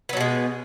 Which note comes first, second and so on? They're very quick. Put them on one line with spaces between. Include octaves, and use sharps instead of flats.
B3 F#3 B2 G#3